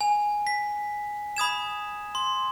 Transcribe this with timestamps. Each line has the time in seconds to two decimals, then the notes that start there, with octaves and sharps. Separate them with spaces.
0.01 G#5
0.47 B6
1.37 B5 D#6 G#6 E7
2.15 C6